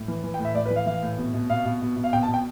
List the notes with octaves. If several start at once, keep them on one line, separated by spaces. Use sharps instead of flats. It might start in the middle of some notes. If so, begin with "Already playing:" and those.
Already playing: A2
E3
E3
G5
A2
E5
A2 D5
B4
E3
F5
E3 F5
A2
B2
B2
B2 F5
B2
B2
B2
F5
B2 G5
A5
B2
G5